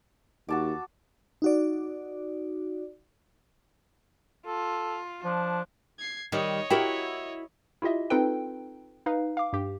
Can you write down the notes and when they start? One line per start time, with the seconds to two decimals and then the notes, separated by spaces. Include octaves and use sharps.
0.49 D#2 F#4 A5 D6
1.42 D#4 F#4 D5
4.46 F4 A4
5.24 F3 D4
5.99 G#6 C7
6.32 D#3 G3 C#5 D#5
6.70 E4 F#4 G4 A#4 G5
7.82 E4 F4 G4 D#5 E5
8.10 C4 D#4 F4 A4 B4 G5
9.06 D#4 B4 F5
9.37 F5 D6
9.53 G2 G4